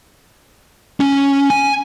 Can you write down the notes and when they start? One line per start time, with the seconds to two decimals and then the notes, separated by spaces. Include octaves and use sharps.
1.00 C#4
1.50 G#5